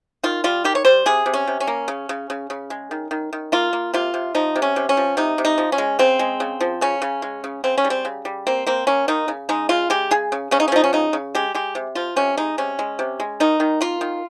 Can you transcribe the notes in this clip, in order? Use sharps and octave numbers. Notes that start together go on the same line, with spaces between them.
D#3 F4
G3 F4
D#3 G4
C#5
G3 C5
C3 G#4
C3
C#4
C3
C#4
A#3
C#3
C#3
C#3
C#3
G#3
D#3
D#3
D#3
A#3 F4
A#3
C3 F4
C3
F3 D#4
C3
C#4
C3
C#4
F3
C3 D#4
C3
D#4
F3
C#4
G#3
C#3 C4
G#3
C#3
F3
C#3 C#4
C#3
G#3
C#3
C#3 C4
C#4
G3
C4
C#3
G3
A#3 C4
A#3 C4
A#3 C#4
D#3 D#4
C#3
G#3 D#4
C#3 F4
G#3 G4
C#3 G#4
C#3
C#3 C#4
D#4
C#4
F3 D#4
C#4
C#3 D#4
C#3
G#3 G4
G#3 G4
C3
F3 F4
C3 C#4
G#3 D#4
C3 C#4
G#3
C3
G#3
D#3 D#4
D#3
A#3 F4
D#3